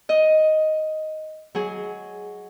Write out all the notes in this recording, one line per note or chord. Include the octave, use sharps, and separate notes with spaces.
D#5
F#3 G#4